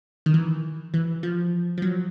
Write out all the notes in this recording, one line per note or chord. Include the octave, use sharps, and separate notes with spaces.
D#3
E3
E3
F3
F3
F#3